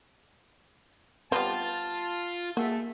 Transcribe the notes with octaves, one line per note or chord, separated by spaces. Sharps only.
G3 B3 C4 F4 A5
A3 A#3 F#4 G#4 A4 E5